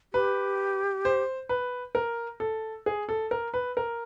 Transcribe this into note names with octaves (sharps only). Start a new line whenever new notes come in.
G4 B4
C5
B4
A#4
A4
G#4
A4
A#4
B4
A#4